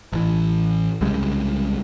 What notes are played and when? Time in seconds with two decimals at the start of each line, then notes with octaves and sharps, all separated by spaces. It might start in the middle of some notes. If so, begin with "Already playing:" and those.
0.13 A1 E3
1.01 C2 C#3 G3 G#3